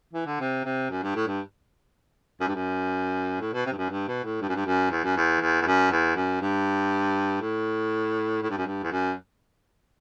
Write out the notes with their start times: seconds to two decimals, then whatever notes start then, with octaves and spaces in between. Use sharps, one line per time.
0.13 E3
0.26 D3
0.40 C3
0.65 C3
0.90 F#2
1.03 G2
1.15 A2
1.27 G2
2.41 F#2
2.48 G2
2.55 F#2
3.41 A2
3.53 B2
3.66 C3
3.72 G2
3.78 F#2
3.90 G2
4.08 B2
4.24 A2
4.41 G2
4.49 F#2
4.55 G2
4.66 F#2
4.91 E2
5.04 F#2
5.17 E2
5.41 E2
5.62 E2
5.67 F#2
5.91 E2
6.16 F#2
6.41 G2
7.41 A2
8.42 A2
8.50 G2
8.58 F#2
8.66 G2
8.83 E2
8.92 F#2